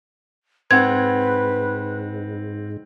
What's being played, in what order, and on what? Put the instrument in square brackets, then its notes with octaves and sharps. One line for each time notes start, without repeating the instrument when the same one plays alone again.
[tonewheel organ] G#2 [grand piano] C4 F#5 [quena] B4 [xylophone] G#6